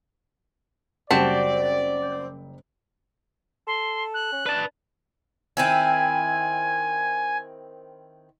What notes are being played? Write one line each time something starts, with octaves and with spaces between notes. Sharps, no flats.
F#1 G3 C4 F#4 D5 A5 B6
A4 C6
F#6
C#4
D4 B4 A5
D#3 C4 E4 G#5